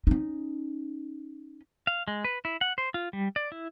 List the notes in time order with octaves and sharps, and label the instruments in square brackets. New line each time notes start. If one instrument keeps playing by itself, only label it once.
[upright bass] C#4 D#4
[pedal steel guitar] F5
G#3
B4
E4
F#5
C5
F4
G3
D5
E4